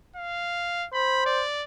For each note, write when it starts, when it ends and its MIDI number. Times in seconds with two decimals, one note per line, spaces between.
0.16 0.87 77
0.94 1.44 72
0.94 1.23 83
1.26 1.64 74